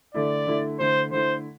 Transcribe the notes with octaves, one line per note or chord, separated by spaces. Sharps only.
D3 A3 E4 D5
D3 A3 E4
D3 A3 E4 C5
D3 A3 E4 C5